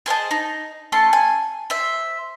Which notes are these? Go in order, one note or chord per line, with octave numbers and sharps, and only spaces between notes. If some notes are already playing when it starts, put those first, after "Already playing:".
G#4 C5 D#5 A5
D#4
A3 C#4 A5 C6
G#5
C5 E5